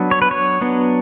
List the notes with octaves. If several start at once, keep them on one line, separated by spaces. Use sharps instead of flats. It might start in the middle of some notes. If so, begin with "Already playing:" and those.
Already playing: F#3 B3 D4
C#5
B4
C#5
F#3 B3 D4